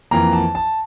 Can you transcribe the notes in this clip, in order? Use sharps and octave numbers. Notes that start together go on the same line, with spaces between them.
F2 E3 A#3 A#5
A5
A5